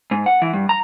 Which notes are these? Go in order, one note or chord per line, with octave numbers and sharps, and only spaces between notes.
G#2
F#5
E3
G2
A#5